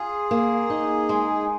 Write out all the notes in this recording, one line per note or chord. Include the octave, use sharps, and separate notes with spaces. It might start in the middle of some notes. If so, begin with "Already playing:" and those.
Already playing: F4 G#4
A#3
D#4
G#3